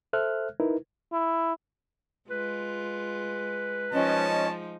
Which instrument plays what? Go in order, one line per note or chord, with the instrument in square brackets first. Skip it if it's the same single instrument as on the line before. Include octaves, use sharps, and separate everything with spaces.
[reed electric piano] A4 C5 E5 F6 F#6
D#4 E4 A#4 B4
[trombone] E4
[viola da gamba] G#3 F4 [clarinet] B4
[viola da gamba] F3 G#3 D#4 [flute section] C#4 D#5 [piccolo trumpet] A5